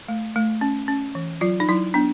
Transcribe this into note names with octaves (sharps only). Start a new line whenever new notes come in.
A3
A3
C#4
C#4
E3
F#3 F4
D#4
F#3 E4
B3 D4